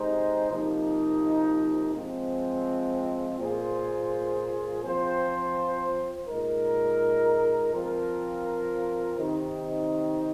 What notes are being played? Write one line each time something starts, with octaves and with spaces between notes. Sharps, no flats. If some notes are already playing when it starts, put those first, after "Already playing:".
Already playing: C3 G#3 D#4 C5
C3 F3 A#3 D#4
F3 G#3 C4
A#2 A#3 F4 G#4 C5
F3 C4 F4 C5
A#2 G#3 D#4 A#4
F3 C4 F4 A#4
C3 D#3 C4 D#4